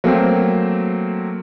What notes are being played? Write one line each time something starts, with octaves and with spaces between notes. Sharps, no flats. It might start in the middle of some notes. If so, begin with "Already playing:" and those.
F#3 A3 A#3 C4 C5